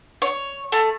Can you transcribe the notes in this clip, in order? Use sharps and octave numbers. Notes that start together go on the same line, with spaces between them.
C#5
A3